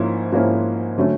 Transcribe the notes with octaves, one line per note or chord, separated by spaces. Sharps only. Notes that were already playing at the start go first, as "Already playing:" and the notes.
Already playing: G#2 F3 A#3 C#4 E4
G#2 F3 A#3 C#4 E4
D3 F#3 A3 C#4